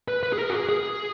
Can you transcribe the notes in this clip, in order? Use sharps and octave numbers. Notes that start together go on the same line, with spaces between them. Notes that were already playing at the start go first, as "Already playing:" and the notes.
B4
B4
G#4
A#4
F#4
G#4
G#4